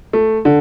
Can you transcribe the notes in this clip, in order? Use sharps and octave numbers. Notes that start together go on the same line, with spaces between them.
A3
D3